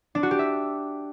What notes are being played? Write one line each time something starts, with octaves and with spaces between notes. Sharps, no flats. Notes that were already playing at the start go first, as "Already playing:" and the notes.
D4
F#4
G4
E5